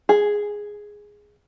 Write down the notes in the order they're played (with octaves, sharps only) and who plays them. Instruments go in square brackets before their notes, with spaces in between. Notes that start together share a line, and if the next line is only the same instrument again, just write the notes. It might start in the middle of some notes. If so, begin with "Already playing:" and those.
[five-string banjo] G#4